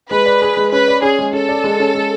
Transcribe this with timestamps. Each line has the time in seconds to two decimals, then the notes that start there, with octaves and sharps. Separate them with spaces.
0.11 G#3 B4
0.26 D5
0.42 G#4
0.57 G#3
0.72 C#4 B4
0.88 D5
1.02 C#4 G#4
1.19 G#3
1.33 C#4 A4
1.48 D5
1.64 G#3
1.80 C#4
1.95 G#3